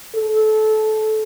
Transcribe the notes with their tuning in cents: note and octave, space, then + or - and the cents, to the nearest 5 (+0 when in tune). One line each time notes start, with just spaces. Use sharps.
A4 -20